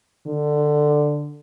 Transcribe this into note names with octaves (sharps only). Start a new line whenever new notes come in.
D3